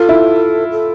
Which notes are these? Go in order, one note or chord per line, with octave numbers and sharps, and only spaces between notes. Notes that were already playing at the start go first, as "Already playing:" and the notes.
Already playing: F4 A4
E4
A4